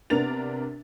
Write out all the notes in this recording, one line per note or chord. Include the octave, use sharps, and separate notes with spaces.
C3 B3 D4 A#4 A6 F7